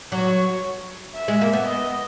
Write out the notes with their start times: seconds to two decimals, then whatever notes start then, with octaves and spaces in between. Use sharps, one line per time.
0.12 F#3 C#5
1.15 E5
1.28 G#3
1.41 A#3
1.53 B3
1.67 D#5